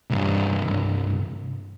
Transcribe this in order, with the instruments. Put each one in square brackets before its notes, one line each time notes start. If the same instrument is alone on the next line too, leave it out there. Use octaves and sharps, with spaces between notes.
[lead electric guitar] C2 G2